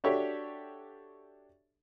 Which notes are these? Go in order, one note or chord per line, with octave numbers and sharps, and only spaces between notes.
D4 F#4 G4 A4 C#5 E5